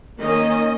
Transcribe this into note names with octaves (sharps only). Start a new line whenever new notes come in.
D#3 A#3 C#4 D#5